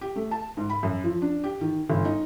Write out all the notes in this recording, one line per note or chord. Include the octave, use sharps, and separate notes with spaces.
G4
A3
A5
G#2
B5
F#2
F3
D4
G4
D#3
G1
D#4